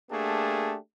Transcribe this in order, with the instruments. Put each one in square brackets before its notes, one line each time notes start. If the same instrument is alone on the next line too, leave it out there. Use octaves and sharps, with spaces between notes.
[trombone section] A3 A#3 D4 G4 G#4